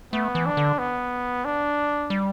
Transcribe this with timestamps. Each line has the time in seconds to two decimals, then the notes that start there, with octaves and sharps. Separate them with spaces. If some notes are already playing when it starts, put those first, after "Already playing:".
0.13 A3 B3
0.35 E3
0.46 D4
0.57 D3
0.79 B3
1.45 D4
2.10 G3